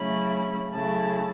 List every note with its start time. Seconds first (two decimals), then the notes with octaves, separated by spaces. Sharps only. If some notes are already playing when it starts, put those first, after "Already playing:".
Already playing: C#3 F#3 A3 C#4 E4 B5
0.73 C#3 F#3 A3 E4 A5